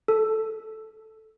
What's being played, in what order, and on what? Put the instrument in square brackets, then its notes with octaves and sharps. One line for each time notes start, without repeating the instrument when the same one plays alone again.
[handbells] A4